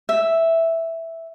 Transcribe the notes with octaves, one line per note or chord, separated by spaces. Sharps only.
E5